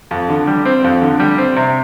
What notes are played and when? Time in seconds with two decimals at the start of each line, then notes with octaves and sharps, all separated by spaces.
0.11 F2
0.29 D3
0.47 G3
0.65 C4
0.84 F2
1.02 D3
1.20 G3
1.38 C4
1.56 C3